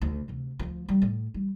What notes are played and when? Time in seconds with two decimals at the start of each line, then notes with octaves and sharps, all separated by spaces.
0.02 D2
0.28 D2 C3
0.59 D2 F3
0.89 G3
1.02 A2
1.34 G3